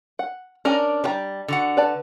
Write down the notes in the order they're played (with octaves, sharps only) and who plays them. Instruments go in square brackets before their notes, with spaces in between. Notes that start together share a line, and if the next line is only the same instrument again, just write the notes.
[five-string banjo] F#5
[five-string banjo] C#4 G#5 [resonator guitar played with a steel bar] D4 A#4 D5
[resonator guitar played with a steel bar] G3 [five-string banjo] D4 G5 A#5
[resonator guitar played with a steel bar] D3 F#4 F#5
[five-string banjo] B4 D5 A5